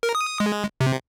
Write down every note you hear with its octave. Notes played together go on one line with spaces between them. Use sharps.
A#4
D#6
G#3
C3